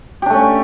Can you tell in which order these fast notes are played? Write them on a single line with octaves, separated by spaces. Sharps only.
G4 D4 A3 C#4